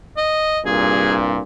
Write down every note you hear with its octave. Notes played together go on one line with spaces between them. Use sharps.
D#5
C2 G2 A#2 G#4